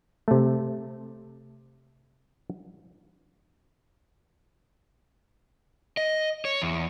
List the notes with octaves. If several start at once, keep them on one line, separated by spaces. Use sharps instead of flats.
C3 A3
D#5
C#5
E2